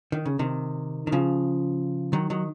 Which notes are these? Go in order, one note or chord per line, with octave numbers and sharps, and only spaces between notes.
D#3
C#3
C3 D#3
D#3
C#3 F3
D#3 F#3
D#3 F#3